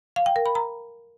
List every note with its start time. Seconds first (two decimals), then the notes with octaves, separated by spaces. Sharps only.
0.16 F5
0.26 G5
0.36 A#4
0.46 B5
0.55 A#5